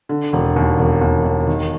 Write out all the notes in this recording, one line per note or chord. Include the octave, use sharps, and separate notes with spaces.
D3
E1
D#2
E1
D#2
D#2
D#3